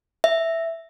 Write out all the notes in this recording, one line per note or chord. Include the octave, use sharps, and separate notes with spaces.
E5